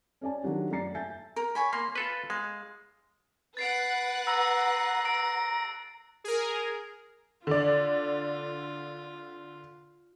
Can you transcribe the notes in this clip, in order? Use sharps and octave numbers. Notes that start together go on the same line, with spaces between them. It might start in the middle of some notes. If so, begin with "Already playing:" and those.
C#4 A4 D5 G#5 A5
D#3 F3 F#3 D4 G4
F#2 A3 D5 A#5 A6 C7
E5 G#5 A5 G6 A6
A#4
C#5 G#5 B5
A#3 C6
F4 A4 B4 B5
G#3 F5
B4 F#5 A6 C7 D7
A#5 E6 F#6
E6 D7
G#4 A#4
D3 F4 D5